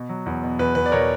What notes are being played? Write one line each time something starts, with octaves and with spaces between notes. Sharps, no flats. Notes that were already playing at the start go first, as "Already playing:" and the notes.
Already playing: B2
F#3
E2
B2
E2 B4
E2 B4
D5
B2 A#4 C#5